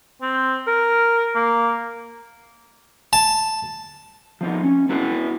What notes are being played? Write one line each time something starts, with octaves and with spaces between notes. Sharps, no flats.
C4
A#4
A#3
A5
F3 B3 D#4
C#4
B3 E4 F#4 B4